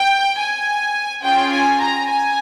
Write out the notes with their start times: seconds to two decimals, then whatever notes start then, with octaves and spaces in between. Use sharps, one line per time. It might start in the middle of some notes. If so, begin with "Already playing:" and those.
Already playing: G5
0.37 G#5
1.22 C#4 F4 G#4 G5
1.51 G#5
1.80 A#5
2.08 G#5